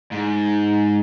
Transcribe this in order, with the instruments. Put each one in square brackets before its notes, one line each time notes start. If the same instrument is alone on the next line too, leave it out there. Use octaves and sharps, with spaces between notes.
[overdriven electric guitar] G#2